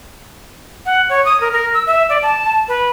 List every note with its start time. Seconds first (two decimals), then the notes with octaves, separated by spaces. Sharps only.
0.86 F#5
1.09 C#5
1.25 D#6
1.41 A#4
1.52 A#4
1.74 E6
1.87 E5
2.09 D5
2.23 A5
2.68 B4